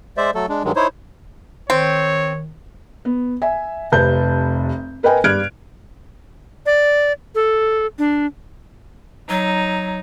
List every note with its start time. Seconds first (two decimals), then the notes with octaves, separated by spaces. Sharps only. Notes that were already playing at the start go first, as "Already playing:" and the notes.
0.17 G#3 C5 D5 E5
0.35 F#3 A3 A4
0.49 G#3 D4
0.64 G2 D#3 F#3 G#3
0.76 D#4 E4 C5 C#5
1.70 D#3 C4 C#5
3.05 B3
3.42 E5 G#5
3.92 F1 C3 B4 A5 G6
5.03 A#4 B4 D#5 G5 G#5
5.24 G2 D5 F6 F#6 G#6 D7
6.66 D5
7.35 A4
7.99 D4
9.29 F#3 D#4